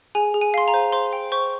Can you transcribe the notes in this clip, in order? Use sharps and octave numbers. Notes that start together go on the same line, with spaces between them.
G#4 G#5
G#4
G#5
F5 C6
A#5
C5
C5 C6
G5
C5 C#6